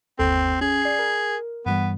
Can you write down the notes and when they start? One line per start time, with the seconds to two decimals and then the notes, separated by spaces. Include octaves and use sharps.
0.19 G1 D#2 C4 A4
0.61 C#4 G#4
0.82 D5 C7
0.99 A#4
1.66 G2 E3 G3 B3